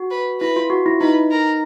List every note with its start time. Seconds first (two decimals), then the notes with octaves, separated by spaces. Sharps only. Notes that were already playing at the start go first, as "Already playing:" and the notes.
Already playing: F#4
0.11 B4
0.40 E4 B4
0.56 F4
0.70 F#4
0.86 E4
1.01 D#4 B4
1.31 A#4